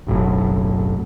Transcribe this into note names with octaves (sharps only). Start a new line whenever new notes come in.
F#1 B1 F#2 A2